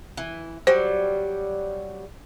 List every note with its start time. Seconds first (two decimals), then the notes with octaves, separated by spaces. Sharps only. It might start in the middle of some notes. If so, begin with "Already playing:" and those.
0.17 E3
0.67 F#3 G3 C5